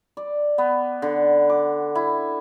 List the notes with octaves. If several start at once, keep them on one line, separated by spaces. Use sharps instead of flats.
D5
B3
D3
D6
E4